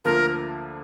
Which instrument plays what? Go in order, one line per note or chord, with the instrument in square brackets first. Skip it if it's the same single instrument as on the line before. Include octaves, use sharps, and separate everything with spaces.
[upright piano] D2 D3 F3 A#3 F4 [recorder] A#4